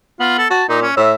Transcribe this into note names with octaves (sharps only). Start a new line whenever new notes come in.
B3 F4
A4
F#4 A5
A#2 D#4
C#4
A2 E5